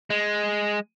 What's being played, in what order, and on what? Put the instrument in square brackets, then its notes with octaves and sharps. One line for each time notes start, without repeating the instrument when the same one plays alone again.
[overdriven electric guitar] G#3